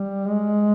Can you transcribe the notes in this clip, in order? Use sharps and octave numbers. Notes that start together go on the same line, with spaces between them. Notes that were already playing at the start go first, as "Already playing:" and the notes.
Already playing: G3
G#3